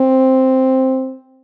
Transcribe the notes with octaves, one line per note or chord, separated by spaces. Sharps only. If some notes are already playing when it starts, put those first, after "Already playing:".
Already playing: C4